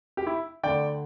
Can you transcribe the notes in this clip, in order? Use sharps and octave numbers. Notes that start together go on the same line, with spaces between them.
G4
E4
D2 D3 D5 G5